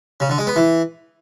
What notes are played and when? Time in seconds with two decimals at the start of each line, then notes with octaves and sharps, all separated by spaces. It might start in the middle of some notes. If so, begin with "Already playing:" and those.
0.20 C#3
0.29 D3
0.38 G#3
0.47 B3
0.56 E3